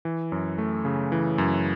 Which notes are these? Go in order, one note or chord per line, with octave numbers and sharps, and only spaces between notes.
E3
F#2
A3
C#3
E3
F#2